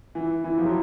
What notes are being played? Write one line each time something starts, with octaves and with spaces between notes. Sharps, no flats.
E3
E3
F3
F#3